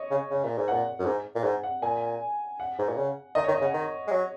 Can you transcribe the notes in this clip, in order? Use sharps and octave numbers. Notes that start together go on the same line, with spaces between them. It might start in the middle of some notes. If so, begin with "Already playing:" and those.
Already playing: C#5 D#5 C#6
C#3
C#3
A#2
G#2
A#2 F#5
F#2
G#2
A#2
G#2 F#5
F#5
A#2 G#5
F#5
G#2
A#2
C#3
D#3 D#5
C#5
D#3
D#5
C#3
F#5
D#3
G#3
F#3